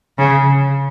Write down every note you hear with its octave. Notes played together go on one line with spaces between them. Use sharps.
C#3